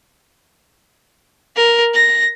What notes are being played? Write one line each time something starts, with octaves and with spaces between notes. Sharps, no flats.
A#4
A#6